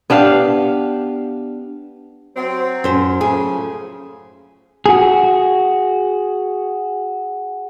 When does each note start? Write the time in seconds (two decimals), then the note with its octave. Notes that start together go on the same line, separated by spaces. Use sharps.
0.10 B3 D4 G4 F5
2.35 F#3 C4
2.84 F#2 C5
3.21 C#3 F3 A3 G#4
4.86 F#4 G#4